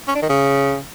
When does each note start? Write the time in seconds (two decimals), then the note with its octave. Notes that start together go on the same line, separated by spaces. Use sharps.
0.08 C#4
0.15 D4
0.22 D#3
0.29 C#3